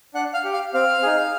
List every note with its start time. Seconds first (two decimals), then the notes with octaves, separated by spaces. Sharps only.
0.14 D4 F#5 F#6
0.34 F5 F6
0.44 G4
0.53 F5 F6
0.74 C4 F5 F6
1.03 D#4 G#4